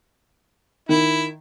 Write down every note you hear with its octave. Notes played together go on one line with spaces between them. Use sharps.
D#3 E4